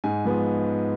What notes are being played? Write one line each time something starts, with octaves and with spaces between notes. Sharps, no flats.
G#2 G#5
F3 G#3 B3